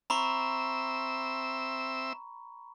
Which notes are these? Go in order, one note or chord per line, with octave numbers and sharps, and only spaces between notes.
C4 E5 A#5 B5 C#6 E6